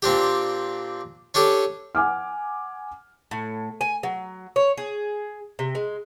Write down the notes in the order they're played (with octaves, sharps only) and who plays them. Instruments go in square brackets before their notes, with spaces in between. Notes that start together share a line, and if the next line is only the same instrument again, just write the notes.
[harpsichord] A#2 C4 D4 G4
C#4 D4 G4 A4
[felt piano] F#5 G#5 D6 F6
[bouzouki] A2
G#5
F#3
C#5
G#4
C3
G#3